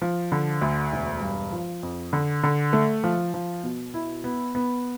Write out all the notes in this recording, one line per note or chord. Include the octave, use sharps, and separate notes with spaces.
F3
D3
D2
E1
G2
F3
F2
D3
D3
A3
F3
F3
B2
E4
B3
B3